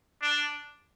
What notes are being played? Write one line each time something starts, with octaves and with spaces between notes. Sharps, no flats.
D4